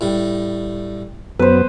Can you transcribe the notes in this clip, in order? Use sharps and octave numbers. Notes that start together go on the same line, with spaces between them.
A2 G3
F#2 B3 B4 C5